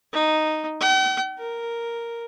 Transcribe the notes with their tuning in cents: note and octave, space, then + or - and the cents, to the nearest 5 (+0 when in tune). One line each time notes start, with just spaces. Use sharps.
D#4 -5
G5 -45
A#4 +0